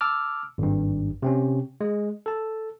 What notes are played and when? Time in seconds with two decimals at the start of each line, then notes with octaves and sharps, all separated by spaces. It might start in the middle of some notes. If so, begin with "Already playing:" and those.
0.01 A5 D6 E6 F6
0.58 G#1 G2
1.22 C3 C4 C#4
1.81 G#3
2.26 A4 A5